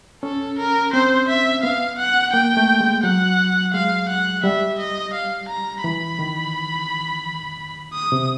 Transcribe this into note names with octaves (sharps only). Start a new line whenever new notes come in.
C#4 A4
A#4
C4 C5
E5
B3 F5
F#5
A#3 G5
A3
G#3
F#3 F#5
G#3 F5
F#5
G3 E5
D#5
F5
A#5
E3 B5
D#3
D#6
C3